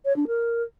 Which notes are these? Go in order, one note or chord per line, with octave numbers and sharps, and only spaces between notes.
C#5
D4
A#4